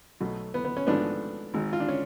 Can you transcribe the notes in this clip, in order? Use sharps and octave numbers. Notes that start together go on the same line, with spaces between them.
B1 B2 A3
B3
B3
C#4
G#1 G#2 F3 A3 B3 D4
G#1 G#2 G#3
F4
D4
C#4